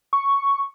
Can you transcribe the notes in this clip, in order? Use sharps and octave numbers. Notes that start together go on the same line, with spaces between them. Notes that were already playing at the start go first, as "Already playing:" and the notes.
C#6